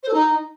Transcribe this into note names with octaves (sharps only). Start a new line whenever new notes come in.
C5
A4
D#4